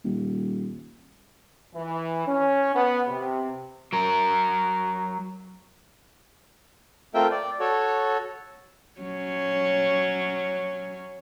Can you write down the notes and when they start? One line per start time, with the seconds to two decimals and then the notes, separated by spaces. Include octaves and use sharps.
0.04 D#1
1.74 E3
2.27 C#4
2.75 B3
3.08 C3
3.93 F#3 A#4
7.14 A3 C4 F4 A#4 E5 G5
7.31 D5
7.60 F#4 A4 C#5
9.01 F#3 C#4